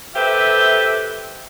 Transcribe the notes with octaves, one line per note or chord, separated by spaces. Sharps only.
G4 A4 B4 C5 E5